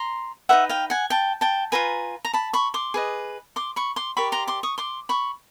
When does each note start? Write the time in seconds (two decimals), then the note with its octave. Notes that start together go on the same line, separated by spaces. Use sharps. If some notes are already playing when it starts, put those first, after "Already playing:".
Already playing: A#5 C6
0.49 D#4 G4 B4 E5 F#5
0.69 F5 G5
0.90 F#5 G#5
1.10 G5 A5
1.41 G5 A5
1.72 F4 G#4 B4 G#5 A#5
2.25 A#5
2.33 A5 B5
2.53 B5 C#6
2.74 C6 D6
2.94 G#4 B4 D#5
3.56 C6 D6
3.76 B5 C#6
3.96 C6 D6
4.17 G4 A#4 D5 B5 C#6
4.32 A#5 C6
4.48 C6 D6
4.63 C#6 D#6
4.78 C6 D6
5.09 B5 C#6